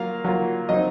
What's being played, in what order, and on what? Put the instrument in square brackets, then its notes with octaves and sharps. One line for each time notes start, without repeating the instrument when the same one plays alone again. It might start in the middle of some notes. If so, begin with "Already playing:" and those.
Already playing: [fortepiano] F#3 A#3 F4 F5
F#3 A#3 F4
F#3 C4 D#4 D#5